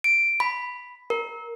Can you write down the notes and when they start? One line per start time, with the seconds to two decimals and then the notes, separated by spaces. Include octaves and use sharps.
0.04 D7
0.40 B5
1.10 A#4